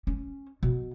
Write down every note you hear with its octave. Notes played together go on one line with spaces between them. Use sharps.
C#4
B2